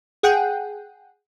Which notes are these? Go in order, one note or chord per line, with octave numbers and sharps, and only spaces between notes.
G#4 F#5 G5